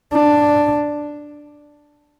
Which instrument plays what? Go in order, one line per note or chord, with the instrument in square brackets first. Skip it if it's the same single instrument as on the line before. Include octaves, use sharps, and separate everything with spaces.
[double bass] D4